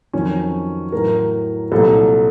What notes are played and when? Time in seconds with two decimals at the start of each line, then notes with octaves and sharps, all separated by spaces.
0.13 F2 D#3 F#3 C#4
0.92 A2 F#3 A#4
1.72 C2 A#2 F#3 A4